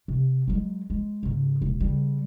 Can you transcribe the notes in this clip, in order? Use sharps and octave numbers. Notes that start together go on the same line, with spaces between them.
C3
F#3 G#3
G#3
G#2 C#3
E1
C#3 G3